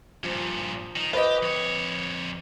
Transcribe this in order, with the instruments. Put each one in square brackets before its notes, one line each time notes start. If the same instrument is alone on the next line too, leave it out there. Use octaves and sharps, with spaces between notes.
[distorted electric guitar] G2 A#2 [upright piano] F3
[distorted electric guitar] D#3 D#4
[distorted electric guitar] F4 G4 [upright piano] B4 D#5
[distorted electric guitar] F2 C#5